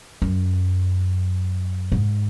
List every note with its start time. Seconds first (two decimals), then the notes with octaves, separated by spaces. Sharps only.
0.22 F#2
1.92 G#2